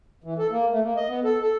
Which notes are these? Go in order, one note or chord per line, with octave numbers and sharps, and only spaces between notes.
E3
A4
A#3
A3
A#3
D#5
B3
A4
A4